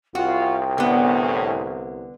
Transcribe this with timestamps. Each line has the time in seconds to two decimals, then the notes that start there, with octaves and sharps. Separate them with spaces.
0.15 C2 F4 F#4 G5
0.78 A2 D3 B3